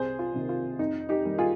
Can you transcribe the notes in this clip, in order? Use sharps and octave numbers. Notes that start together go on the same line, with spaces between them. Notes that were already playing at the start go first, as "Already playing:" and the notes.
Already playing: C2 G#4 C5
F4
C3 D#3 A#3
F4
F2 D#4
D#4 G4
D#3 G3 A#3
F4 G#4